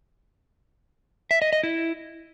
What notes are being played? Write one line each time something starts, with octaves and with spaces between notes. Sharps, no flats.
E5
D#5
D#5
E4